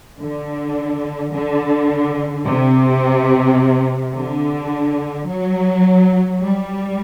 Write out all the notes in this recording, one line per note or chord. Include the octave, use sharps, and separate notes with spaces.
D3
D3
C3
D3
F#3
G3